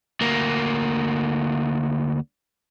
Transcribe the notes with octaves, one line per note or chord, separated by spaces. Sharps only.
D2 A#3